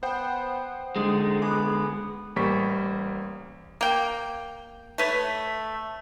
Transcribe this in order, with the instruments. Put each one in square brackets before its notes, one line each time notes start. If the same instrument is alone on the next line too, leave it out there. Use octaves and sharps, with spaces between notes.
[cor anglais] B3 [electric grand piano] C5 F#5 G5
[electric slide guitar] D3 G#3 [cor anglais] D#4
[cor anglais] B3 [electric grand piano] G#5 D6
[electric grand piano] A1 G3 A#3 C5 C#6 B6
[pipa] A#3 G5
A3 B4 C#5